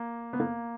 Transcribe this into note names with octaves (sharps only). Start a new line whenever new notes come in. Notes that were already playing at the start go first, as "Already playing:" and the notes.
Already playing: A#3
B3
A#3